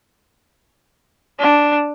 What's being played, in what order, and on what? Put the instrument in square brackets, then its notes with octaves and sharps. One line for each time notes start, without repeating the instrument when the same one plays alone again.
[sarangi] D4